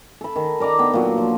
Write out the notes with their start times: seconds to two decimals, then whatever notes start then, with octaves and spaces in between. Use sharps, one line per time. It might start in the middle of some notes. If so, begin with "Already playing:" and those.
0.21 A4 B5
0.36 D#3
0.60 A#4 D5 D#5 A#5
0.79 B3 D4 G5
0.93 A#2 F#3
1.18 F3